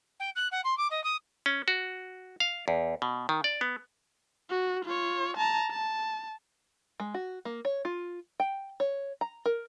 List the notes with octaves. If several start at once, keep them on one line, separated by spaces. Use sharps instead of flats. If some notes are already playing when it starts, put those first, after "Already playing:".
G5
F#6
F#5
C6
D6
D#5
D#6
C#4
F#4
F5
E2
B2
D#3
D5
B3
F#4
F4 C#5
A5 A#5
A5
G#3
F#4
A#3
C#5
F4
G5
C#5
A#5
A#4